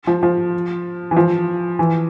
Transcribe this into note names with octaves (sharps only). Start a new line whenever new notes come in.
F3
F3
E3
F3
E3